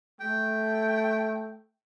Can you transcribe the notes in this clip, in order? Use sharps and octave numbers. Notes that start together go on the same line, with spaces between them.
A3 G5